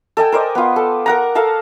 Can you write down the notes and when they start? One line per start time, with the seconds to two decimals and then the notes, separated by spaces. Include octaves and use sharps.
0.17 A4 D#5 G5 G#5
0.32 A#4 C5 D5 D#5
0.55 B3 F4
0.76 A4
1.06 A#4 F#5 A#5
1.35 A4 F5 A5 A#5